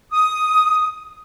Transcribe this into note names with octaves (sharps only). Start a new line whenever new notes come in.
D#6